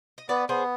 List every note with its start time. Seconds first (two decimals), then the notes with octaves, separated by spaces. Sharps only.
0.18 D#5
0.29 B3 B4 D5
0.49 B3 G#4 C5